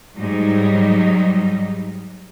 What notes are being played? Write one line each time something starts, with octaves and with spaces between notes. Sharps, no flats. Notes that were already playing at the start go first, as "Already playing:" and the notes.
G#2 F#3 G3 D#4